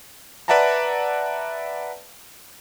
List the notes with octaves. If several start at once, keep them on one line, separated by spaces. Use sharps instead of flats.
B4 D5 E5 F#5 A5 A#5